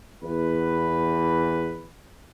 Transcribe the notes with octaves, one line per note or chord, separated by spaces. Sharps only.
E2 B4